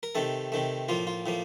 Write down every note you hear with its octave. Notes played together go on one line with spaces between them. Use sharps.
A#4
C3 D#3 A3 A4
C3 D#3 A3
A2 F3 A#3 F4
F4
A2 F3 A#3